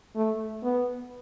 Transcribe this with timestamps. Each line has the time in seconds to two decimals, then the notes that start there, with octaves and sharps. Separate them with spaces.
0.16 A3
0.63 B3